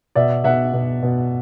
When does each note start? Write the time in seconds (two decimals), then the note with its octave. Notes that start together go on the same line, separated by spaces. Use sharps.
0.15 B2 D5 E5
0.44 B2 E5 F#5
0.74 B2
1.03 B2